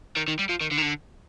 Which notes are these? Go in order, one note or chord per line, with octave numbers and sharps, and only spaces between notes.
D#3
D#3
G3
F3
D#3
D3
D#3
D3